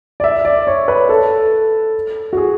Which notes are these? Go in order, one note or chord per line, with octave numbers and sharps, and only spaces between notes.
D5
E5
D5
C#5
B4
A4
F#4
G#4